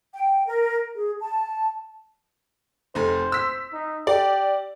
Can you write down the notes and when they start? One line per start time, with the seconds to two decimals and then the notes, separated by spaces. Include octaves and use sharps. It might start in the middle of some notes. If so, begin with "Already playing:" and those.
0.14 G5
0.46 A#4
0.95 G#4
1.21 A5
2.95 F1 A3 D#4 C5
3.32 E6 B6
3.73 D#4
4.07 G4 D5